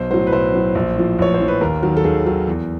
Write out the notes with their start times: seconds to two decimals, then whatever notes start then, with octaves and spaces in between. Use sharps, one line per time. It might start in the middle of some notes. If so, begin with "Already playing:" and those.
Already playing: B1 C5
0.11 A2 F#3 C5
0.27 B4
0.32 B1 C5
0.54 A2 F#3
0.75 A#1
0.96 A2 F3
1.19 A#1 C#5
1.34 C5
1.40 A2 F3
1.48 B4
1.61 D#2 A#4
1.83 D#3 F#3
1.97 A4
2.04 D#2 G#4
2.26 D#3 F#3
2.48 E2